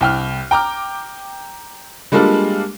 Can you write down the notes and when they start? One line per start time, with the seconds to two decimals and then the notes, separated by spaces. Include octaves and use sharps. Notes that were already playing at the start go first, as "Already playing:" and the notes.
0.01 C2 G5 F6
0.51 G5 A#5 D6 F6
2.12 G3 G#3 A#3 D4 F4 A4